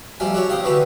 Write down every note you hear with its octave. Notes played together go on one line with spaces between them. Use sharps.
F2 G3 A3 G5 G#5
F#4 G4 A4 C#5 F#5
C2 G4 F5 G5 D#6
D3 E3 F#4 G4 B4 C5